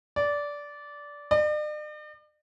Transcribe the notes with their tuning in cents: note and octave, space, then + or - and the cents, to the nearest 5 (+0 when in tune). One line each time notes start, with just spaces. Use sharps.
D5 -15
D5 +45